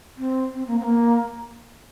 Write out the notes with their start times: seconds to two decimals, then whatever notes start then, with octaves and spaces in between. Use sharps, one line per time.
0.18 C4
0.54 C4
0.67 A#3
0.80 C4
0.84 A#3